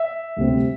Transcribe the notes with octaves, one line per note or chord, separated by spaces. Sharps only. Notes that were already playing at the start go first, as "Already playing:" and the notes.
Already playing: E5
D2 C3 G3 C4